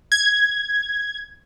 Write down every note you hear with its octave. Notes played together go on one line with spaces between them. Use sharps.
G#6